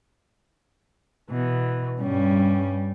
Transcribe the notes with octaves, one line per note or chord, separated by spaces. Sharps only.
B2 E3
G2 G3 C#4